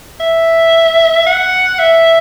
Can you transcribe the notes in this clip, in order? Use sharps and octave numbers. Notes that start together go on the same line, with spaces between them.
E5
F#5
E5